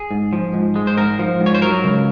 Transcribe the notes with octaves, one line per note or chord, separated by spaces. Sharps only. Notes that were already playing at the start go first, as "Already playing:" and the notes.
Already playing: G#4
G#2
F3
G#2
G#3
C5
G#2 A#4
F3
G#2
C#5
C5
F#3 A#4
C#2